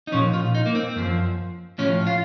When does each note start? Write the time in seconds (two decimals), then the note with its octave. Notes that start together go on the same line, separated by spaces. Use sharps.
0.07 D#4
0.12 A#2 F3 C#4
0.33 F4
0.55 D#4
0.66 A#3
0.75 C4
0.96 F#2 F3
1.78 A2 F3 C#4
2.07 F4